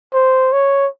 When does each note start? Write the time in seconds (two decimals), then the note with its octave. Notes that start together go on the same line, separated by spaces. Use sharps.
0.14 C5
0.53 C#5